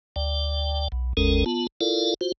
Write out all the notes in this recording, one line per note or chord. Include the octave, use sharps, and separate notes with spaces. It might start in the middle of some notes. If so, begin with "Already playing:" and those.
D2 D5 G5
B1
G1 D#2 G#3 C#4 A4 A#4
B3 F4 A5
E4 F4 A4 A#4 D5 F5
F4 F#4 C5